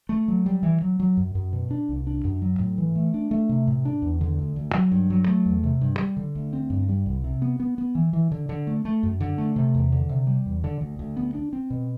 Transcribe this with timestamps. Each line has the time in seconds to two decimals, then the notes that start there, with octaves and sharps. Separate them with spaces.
0.09 A3
0.28 F#3
0.46 G3
0.63 E3
0.82 F#3
1.00 F#3
1.17 F#2
1.35 F#2
1.53 B2
1.71 D4
1.89 C2
2.07 D4
2.25 F#2
2.42 F#3
2.59 A2
2.78 E3
2.95 A3
3.14 D4
3.31 A3
3.49 C3
3.67 A2
3.85 D4
4.02 E2
4.21 D3
4.39 D2
4.56 D2
4.74 F#3
4.92 G2
5.10 F#3
5.28 A3
5.46 E2
5.64 C3
5.81 G2
5.99 G3
6.17 D3
6.35 D2
6.53 C4
6.70 G2
6.89 G3
7.06 C2
7.24 C3
7.42 B3
7.60 B3
7.78 B3
7.95 E3
8.13 E3
8.32 D3
8.49 D3
8.67 A3
8.85 A3
9.03 F#2
9.20 D3
9.38 A3
9.56 C3
9.75 E2
9.92 D3
10.09 C3
10.27 G3
10.46 E2
10.64 D3
10.81 D2
10.99 D2
11.17 B3
11.34 D4
11.53 C4
11.70 B2